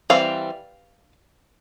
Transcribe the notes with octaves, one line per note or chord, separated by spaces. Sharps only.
E3 G3 C4 F5